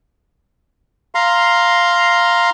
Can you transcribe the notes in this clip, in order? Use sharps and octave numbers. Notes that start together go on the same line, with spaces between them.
F5 A#5 C6